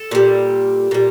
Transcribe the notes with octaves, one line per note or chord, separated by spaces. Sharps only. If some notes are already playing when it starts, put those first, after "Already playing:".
Already playing: A4
A#2 G3
A#2 G3